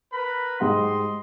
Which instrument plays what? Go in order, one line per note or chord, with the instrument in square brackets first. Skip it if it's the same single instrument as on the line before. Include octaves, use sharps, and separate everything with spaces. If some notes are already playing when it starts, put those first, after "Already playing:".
[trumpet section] A#4 B4 B5
[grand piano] G#2 G4 F#5 [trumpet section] D#5 C6